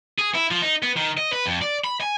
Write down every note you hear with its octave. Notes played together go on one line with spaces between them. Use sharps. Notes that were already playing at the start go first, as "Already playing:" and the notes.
G#4
E4
F3
D#4
B3
D#3
D#5
B4
F2
D5
B5
G#5